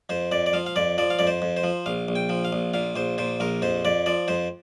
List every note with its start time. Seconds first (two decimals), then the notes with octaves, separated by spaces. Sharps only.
0.09 F2 C5
0.32 F2 D5
0.46 D5
0.53 F3 F5
0.66 F5
0.76 F2 D5
0.98 F3 D5
1.10 F5
1.19 F2 D5
1.27 C5
1.42 F2
1.57 C5
1.64 F3
1.86 A#1 F5
2.08 A#1
2.15 G5
2.29 F3
2.45 F5
2.53 A#1
2.74 A#2 F5
2.96 A#1 C5
3.18 A#2 C5
3.40 A#1 A#4
3.62 F2 C5
3.85 F2 D5
4.06 F3 D5
4.28 F2 C5